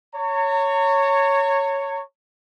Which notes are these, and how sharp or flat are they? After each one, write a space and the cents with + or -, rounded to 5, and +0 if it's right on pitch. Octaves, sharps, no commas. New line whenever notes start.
C#5 +0 A#5 -40